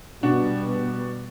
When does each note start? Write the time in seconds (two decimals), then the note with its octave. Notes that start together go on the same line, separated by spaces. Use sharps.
0.22 B2 G3 B3 D4 F#4